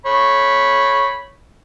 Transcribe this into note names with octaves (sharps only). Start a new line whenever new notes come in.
C#5 B5